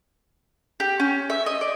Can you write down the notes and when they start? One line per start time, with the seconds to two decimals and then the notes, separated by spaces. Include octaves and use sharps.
0.80 G4
1.00 C#4
1.30 E5
1.46 D#5
1.61 D5